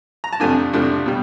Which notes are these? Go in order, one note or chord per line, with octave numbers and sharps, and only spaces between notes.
A#5
A5
F2 C3 F3 A3 D4 G#5
F2 C3 F3 A3 D4
B2 G3